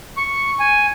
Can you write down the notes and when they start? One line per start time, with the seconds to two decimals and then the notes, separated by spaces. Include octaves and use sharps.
0.17 C#6
0.60 G#5